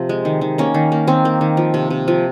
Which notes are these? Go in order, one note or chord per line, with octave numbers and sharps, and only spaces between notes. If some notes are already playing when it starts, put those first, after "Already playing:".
Already playing: C3 F3
G#3
D#3
D#3
A#3 C#4
D#3
A#3
D#3 C4
A#3
D#3
F3
C3
C3
F3